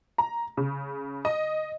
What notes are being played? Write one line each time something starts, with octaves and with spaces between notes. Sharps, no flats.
A#5
C#3
D#5